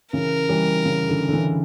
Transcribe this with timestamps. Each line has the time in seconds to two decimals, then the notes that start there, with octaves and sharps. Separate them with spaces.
0.13 C#3 E3 A#4
0.49 E3 G3
0.85 C#3
1.09 D3
1.28 D3
1.33 C#3 E3